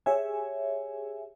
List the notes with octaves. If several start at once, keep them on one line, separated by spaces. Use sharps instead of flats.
G4 G#4 C#5 E5 G#5